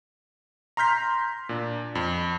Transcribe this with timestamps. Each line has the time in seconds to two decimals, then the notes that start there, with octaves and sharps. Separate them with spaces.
0.77 A#5 C6 F6 G6 B6
1.49 A#2 D4
1.95 F2